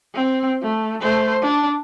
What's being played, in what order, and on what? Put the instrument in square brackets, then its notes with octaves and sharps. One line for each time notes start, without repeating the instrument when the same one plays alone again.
[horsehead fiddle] C4
A3
A3 C5
D4